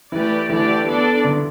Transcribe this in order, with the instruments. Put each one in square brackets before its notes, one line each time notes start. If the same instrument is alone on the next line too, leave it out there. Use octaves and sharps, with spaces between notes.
[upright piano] E3 [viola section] A3 G4 B4 D5
[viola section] D3 A3 G4 D5 [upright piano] E3
[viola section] B3 D4 A4 D5
[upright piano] D3